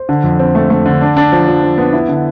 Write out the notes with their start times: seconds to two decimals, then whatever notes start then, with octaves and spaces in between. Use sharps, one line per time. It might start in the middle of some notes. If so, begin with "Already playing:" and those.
Already playing: C5
0.09 D3
0.24 F2
0.39 C4
0.55 A3
0.70 A3
0.86 D3
1.01 D4
1.17 D4
1.32 F3
1.48 F3
1.63 F3
1.78 B3
1.93 E4
2.09 D3